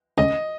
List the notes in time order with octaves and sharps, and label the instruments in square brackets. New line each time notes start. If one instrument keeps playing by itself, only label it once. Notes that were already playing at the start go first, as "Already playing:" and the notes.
[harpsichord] C#2 [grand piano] D#5